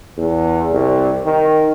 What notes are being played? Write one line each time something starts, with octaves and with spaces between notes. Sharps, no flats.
E2
C2
D#3